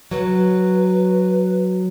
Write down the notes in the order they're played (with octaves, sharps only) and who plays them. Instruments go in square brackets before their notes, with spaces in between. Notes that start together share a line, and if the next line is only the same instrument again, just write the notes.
[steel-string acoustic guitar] F#3 [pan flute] B4